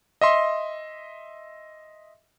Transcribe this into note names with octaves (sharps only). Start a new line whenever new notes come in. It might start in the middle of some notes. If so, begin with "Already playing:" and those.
D#5 E5 C6